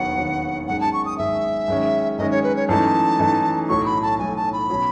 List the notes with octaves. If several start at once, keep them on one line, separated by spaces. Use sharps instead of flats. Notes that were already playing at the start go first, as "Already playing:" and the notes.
Already playing: E1 D#2 D#3 F#3 B3 F#5
E1 D#2 D#3 F#3 B3
G#1 F#2 D#3 G#3 F#5
A5
C#6
D#6
G#1 F#2 D#3 G#3 E5
F#2 D#3 G#3 C#4
F#2 D#3 G#3 C#4 D#5
C#5
B4
C#5
F#2 E3 A3 D#4 A5
F#2 E3 A3 D#4
B1 A2 F#3 A3 C#6
B5
A5
B1 A2 F#3 A3 G#5
A5
B5
B2 F#3 C#4